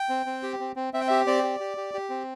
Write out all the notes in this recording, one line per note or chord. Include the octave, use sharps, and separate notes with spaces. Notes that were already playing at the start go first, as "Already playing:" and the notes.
Already playing: G5
C4
C4
G4
C4
C4
C4 E5
G5
G4 E5
C4 D5
G4
G4
G4
G4
C4